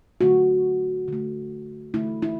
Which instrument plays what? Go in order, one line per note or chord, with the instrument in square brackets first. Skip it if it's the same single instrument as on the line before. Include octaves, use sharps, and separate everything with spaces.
[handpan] D3 A3 F#4
D3 A3
D3 A3 E4
E4